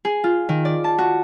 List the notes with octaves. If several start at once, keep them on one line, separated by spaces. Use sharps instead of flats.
G#4
F4
D#3
D5
A5
F#4